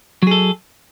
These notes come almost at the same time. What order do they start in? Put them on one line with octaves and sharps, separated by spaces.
F#3 G#4 A4